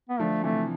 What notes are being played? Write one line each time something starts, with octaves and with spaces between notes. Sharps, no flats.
B3
D3 F3 A3
C3 E3 A3